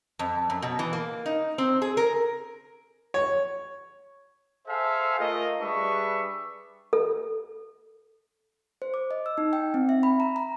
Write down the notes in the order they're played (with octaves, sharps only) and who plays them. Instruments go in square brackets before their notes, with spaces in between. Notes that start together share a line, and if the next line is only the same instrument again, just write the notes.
[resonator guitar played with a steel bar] F2
F#2
B2
E3
A#3
D#4
C4
G#4
A#4
[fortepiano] C#5
[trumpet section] G#4 A4 C5 E5 F5 G#5
A3 F4 A4 A#4 D#5
G3 D4 G#4 B4 E5 C#6
[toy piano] A4
[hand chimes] C5
D6
D#5
E6
D#4
G5
C4
E5
B5
A#5
A#5